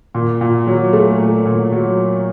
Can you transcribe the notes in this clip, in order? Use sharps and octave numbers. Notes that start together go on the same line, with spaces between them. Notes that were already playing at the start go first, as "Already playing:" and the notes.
A#2
A#2
F#3
A3
A#2
A#2
F#3